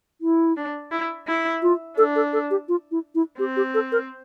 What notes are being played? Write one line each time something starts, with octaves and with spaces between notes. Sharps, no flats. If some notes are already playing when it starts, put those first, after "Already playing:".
E4
D4
E4
E4
F4
D4 A4
A4
A4
G4
F4
E4
E4
C4 G4
G4
A4
A#4